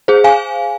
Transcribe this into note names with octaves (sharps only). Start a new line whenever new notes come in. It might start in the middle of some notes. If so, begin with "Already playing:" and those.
G#4 C5
F5 G#5